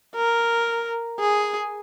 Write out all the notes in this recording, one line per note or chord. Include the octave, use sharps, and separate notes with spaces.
A#4
G#4